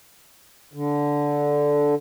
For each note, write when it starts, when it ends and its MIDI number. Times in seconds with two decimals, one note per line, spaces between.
0.74 1.95 50